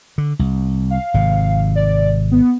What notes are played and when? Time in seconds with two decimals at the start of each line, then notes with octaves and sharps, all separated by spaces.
0.18 D3
0.39 C2
0.90 F5
1.14 G#1 C3
1.76 D5
2.31 B3